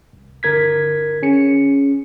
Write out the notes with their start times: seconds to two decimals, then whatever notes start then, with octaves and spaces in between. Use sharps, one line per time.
0.13 C2
0.43 G1 D3 A#4 G#6 B6
1.23 C#4 G#4 C#7